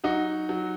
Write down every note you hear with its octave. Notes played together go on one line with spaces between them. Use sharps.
F#3 D#4 F#4
F#3